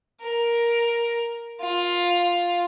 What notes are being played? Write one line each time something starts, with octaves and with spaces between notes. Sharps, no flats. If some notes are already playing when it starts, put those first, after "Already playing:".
A#4
F4